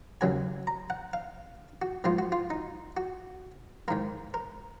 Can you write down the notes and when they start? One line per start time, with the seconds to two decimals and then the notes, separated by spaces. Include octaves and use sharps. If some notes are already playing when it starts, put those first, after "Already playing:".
0.21 D#2 C#3 F#3 A#3 G#5
0.67 A#5
0.90 F#5
1.13 F5
1.82 F#4
2.04 G#2 F3 A#3 F4
2.19 F#4
2.32 F4
2.50 D#4
2.97 F#4
3.88 G#2 D#3 A#3 A#4
4.34 A#4